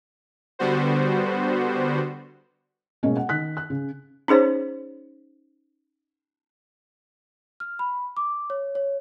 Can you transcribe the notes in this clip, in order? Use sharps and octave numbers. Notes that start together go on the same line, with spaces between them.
D3 G3 B3 F#4 C5
B2 G#3 A#3 C#4 G#4
F#5
D#3 F#6 B6
F#6
C#3
C#4 D#4 G#4 C5 C#5
F6
B5
D6
C#5
C#5